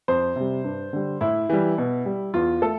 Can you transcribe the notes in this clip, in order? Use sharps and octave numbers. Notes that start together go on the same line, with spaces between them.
F2 C5
C3 G3
G2
D3 G3
A2 E4
E3 G3
B2
G3
E2 F4
A3 A4